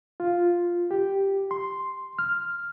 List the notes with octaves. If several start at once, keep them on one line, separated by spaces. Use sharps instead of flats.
F4
G4
C6
F6